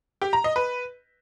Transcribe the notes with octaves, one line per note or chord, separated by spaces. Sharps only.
G4
A#5
D#5
B4